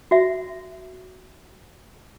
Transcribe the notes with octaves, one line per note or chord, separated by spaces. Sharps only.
F#4 E5